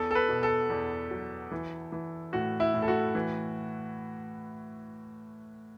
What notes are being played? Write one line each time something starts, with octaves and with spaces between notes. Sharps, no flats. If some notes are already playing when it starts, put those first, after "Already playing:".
Already playing: E2 A4
A4
B4
B2
A4
E2
F#3
E3
E3
A2 F#4
E4
A2
A4
F#4
E3